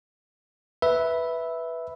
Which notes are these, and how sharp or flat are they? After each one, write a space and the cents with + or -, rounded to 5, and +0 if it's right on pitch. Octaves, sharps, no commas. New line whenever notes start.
B4 +0 E5 -5